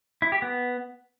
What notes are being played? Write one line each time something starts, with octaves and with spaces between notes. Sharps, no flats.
E4
G4
B3